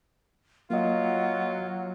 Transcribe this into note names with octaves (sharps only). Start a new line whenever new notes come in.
F#3 A#3 F4 D#5